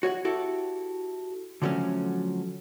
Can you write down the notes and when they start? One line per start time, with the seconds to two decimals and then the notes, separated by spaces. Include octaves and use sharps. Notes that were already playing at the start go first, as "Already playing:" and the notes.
0.03 F#4 C#5 D#5 F#5
0.25 E4 F#4 G4 A4
1.62 D3 F3 F#3 A3 C#4